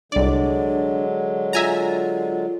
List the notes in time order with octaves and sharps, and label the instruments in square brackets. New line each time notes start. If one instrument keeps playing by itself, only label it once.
[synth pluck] C2 D5 [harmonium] D3 F#3 G#3 [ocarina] D4
[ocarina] F4 [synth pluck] E5 G#5 A#5